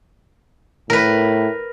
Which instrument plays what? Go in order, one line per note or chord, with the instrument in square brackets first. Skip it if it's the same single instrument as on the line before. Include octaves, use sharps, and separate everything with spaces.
[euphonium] A2 [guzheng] A#4 B4